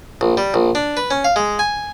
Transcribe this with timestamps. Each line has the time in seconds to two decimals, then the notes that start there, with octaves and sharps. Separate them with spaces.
0.21 A#1
0.37 G3
0.54 A#1
0.75 D4
0.97 B4
1.11 C#4
1.25 F5
1.36 G#3
1.59 G#5